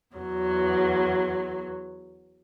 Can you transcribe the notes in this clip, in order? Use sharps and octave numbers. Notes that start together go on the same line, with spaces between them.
E2 F#3